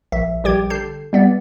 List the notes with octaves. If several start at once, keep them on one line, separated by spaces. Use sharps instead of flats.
A#1 E5
A#1 G3 G4 G5 G#6
D3 A5 G6 C7
G3 B3 D5